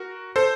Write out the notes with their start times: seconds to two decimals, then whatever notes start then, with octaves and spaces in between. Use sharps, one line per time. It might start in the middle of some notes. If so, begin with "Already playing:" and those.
Already playing: F#4 A#4
0.36 A4 C5